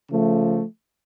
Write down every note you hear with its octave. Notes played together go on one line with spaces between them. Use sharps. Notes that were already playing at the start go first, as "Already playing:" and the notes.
C#3 F3 A3